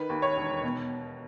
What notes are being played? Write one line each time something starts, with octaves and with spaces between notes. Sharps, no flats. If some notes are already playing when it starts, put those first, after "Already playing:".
Already playing: D#3 B4
D#2
C#5
E1
B2